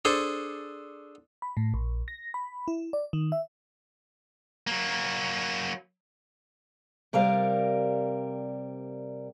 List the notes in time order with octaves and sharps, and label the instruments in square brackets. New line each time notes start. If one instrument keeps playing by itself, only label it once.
[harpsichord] D4 G#4 A4 C5
[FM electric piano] B5
A2
A#1
A#6
B5
E4
D5
D#3
E5
[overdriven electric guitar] F#3 A#3
[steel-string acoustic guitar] C3 G3 A#4 D5 F5